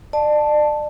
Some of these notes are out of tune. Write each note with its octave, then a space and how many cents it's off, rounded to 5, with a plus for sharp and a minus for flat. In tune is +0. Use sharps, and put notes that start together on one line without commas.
D5 +35 A5 +0